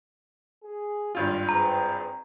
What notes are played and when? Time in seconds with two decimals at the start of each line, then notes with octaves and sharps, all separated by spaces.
0.64 G#4
1.15 G#1 G2 G3 F4
1.49 C4 G#4 B4 A#5